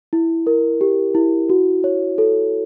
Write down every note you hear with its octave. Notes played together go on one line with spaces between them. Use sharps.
E4
A#4
G4
E4
F#4
C#5
A4